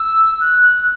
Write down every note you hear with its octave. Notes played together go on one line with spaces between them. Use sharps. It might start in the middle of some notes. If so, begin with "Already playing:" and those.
Already playing: E6
F#6